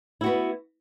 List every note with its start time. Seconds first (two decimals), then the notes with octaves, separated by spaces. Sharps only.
0.21 E4
0.24 F#4
0.26 B3